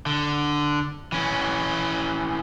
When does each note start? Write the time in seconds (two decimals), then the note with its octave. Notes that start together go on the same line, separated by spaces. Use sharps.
0.06 D3
1.12 E3 C#4